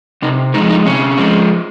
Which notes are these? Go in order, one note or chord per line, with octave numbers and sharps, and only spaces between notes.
C3 D#4
F3 G#3 D#4
D#4
C3 C#4
F3 G#3